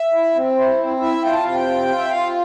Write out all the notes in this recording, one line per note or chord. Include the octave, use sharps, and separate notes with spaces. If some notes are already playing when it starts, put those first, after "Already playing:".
Already playing: E5
E4
C4
E4 C5
C4
E4 E5
F4 G5
A5
C3 F5
G5
F4
F4
E5
F4 F5